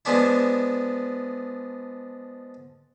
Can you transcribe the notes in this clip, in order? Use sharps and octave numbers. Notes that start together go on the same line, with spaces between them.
F3 G#3 B3 D4 E4